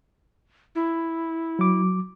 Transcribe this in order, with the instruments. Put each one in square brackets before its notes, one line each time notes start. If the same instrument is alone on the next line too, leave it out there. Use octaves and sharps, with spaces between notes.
[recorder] E4
[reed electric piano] F#3 D6